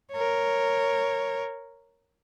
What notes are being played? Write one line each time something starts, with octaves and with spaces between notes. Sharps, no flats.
A#4 C#5